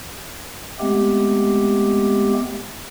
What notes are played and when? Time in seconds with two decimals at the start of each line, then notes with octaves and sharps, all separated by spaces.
0.80 G#3 A3 B3 C4 G4